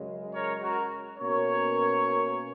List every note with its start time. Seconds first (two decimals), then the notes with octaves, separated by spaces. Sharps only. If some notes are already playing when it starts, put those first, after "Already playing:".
Already playing: F#2 C#3 G#3
0.33 A#4 C#5
0.62 F#4 A#4
1.18 B2 A#3 C#4 A#4 C#5